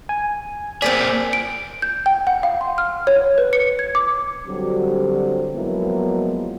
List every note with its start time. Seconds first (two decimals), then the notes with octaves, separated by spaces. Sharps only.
0.09 G#5
0.82 A#3 C4 G#4 D5 B6
1.33 D7
1.82 G6
2.06 G5
2.27 F#5
2.43 F5
2.61 C6
2.78 F6
3.07 C#5
3.38 B4
3.53 C#7
3.79 G#6
3.95 D6
4.47 D3 F#3 G3 C4 F#4 G4
5.54 F3 F#3 G#3 A#3 B3 E4